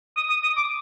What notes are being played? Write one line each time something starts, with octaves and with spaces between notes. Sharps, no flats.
D#6
D#6
D#6
D6